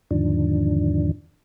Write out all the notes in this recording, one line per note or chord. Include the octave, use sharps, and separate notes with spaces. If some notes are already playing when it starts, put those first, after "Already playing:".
E2 G#2 D3 D#3 F3 D4